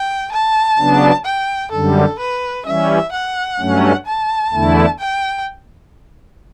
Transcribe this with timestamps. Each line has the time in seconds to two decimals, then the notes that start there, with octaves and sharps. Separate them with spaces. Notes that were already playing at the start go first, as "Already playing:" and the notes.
Already playing: G5
0.32 A5
0.79 C#3 F#3 B3 D4
1.25 G5
1.72 F#2 D3 G3 A4
2.20 B4
2.66 E3 G3 C#4 E5
3.12 F#5
3.59 G2 F#3 A3 C#4
4.06 A5
4.52 E2 D3 A3 E4
4.99 G5